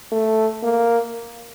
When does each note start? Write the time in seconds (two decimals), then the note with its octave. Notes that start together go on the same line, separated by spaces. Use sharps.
0.12 A3
0.63 A#3